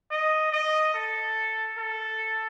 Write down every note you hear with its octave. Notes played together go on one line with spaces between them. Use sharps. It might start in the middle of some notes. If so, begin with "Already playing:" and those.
D#5
D#5
A4
A4